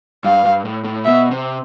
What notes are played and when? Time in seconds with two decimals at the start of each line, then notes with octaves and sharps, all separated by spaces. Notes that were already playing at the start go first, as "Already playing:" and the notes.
0.24 G2 F5
0.45 G2
0.65 A2
0.84 A2
1.04 B2 E5
1.31 C3